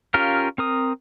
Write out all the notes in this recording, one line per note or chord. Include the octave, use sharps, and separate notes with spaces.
C#4 F4 G4 A#4 F5
C4 A#4 D#6